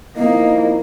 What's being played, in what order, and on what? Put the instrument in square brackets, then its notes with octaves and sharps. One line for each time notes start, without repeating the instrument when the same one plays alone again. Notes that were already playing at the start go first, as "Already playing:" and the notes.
[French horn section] F3 D#4 E4 [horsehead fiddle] A#3 [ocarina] D#5